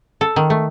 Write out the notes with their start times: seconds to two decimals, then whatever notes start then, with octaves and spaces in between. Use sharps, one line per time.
0.21 A4
0.36 D#3
0.50 A3